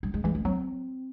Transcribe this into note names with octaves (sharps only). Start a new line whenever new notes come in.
G3
G#3
E3 G#3
G#3
F#3 C4